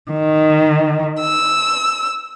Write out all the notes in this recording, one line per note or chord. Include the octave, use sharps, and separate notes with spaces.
D#3
E6